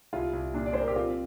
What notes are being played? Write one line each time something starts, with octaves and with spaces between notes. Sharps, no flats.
C2 F4
C2
A#2 D4
D5
A#2 C5
A#4
G4
C4 F4